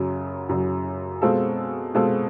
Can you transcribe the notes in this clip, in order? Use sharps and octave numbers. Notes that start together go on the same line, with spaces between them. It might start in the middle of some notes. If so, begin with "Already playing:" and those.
Already playing: F#2 C#3 F#3
F#2 C#3 F#3
B2 G#3 C4 F4 A4
B2 G#3 C4 F4 A4